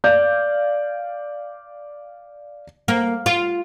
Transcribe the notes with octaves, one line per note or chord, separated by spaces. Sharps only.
D5 F5 G6
A#3
F4